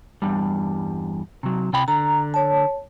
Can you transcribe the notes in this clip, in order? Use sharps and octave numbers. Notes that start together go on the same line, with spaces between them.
E2 G2 G3
C3 F#3
C3 G5 B5
D3 A#5
C#5 A5